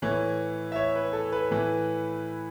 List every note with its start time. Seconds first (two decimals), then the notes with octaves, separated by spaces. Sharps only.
0.02 A2 E3 C#5
0.72 E5
0.76 C#5
0.95 B4
1.13 A4
1.32 B4
1.51 A2 E3